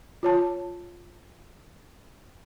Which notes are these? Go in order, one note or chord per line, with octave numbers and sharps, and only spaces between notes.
F4 C#5 A5